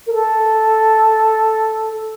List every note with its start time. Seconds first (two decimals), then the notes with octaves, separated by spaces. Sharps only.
0.07 A#4
0.13 A4